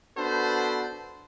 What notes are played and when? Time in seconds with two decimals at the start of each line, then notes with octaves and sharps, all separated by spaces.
0.18 B3 D4 F#4 A4 C5 B5